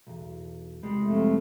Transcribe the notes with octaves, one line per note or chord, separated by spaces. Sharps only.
B1 E2
C2 G3 G#3
F2 A3